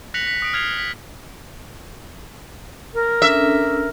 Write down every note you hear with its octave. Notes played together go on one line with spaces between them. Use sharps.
F#6 A#6 B6 C#7 F7 F#7
B6
D#6 D7
F6 G#6 C7 F7
B6
A#4
C#4 D4 A4 E5